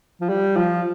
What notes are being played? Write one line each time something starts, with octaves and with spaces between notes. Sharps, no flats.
F3
G3
F3